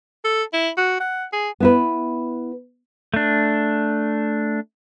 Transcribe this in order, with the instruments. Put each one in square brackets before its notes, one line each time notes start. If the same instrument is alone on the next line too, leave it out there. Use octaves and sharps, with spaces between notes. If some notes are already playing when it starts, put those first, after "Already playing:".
[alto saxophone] A4
E4
F#4
F#5
G#4
[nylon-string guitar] B3 E4 B4
[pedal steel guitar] A3 D4